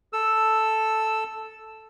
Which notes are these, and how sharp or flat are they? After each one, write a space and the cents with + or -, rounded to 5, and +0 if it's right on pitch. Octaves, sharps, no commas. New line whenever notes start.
A4 +0 E6 +0